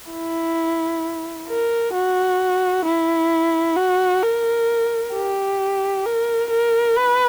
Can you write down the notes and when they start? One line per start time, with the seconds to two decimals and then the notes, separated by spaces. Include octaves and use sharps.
0.11 E4
1.48 A#4
1.94 F#4
2.85 E4
3.76 F#4
4.23 A#4
5.14 G4
6.06 A#4
6.50 A#4
6.96 B4